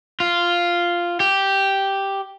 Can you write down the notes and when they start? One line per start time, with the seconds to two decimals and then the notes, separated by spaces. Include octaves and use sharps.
0.20 F4
1.20 G4